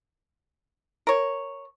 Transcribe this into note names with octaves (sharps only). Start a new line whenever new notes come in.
A#4 C#5